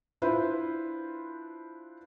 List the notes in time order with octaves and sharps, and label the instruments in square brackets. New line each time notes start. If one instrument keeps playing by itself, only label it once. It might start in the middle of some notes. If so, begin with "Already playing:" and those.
[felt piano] D4 E4 F4 B4 C5